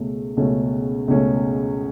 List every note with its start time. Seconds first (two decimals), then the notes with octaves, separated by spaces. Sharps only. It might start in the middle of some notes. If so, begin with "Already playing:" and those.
Already playing: C#2 B2 A3 C#4
0.37 C#2 B2 A3 C#4
1.08 C#2 B2 A3 C#4